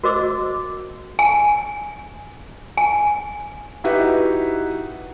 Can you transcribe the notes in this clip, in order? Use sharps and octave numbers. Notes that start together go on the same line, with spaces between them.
F#4 A#4 C5 D#5 D6 E6
G#5
G#5
D#4 E4 F#4 G4 B4 E5